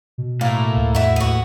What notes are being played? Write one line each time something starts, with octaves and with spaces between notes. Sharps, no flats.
B2
A2 A#3
C#2
E2 E4 F#4
D#2 B3 F#4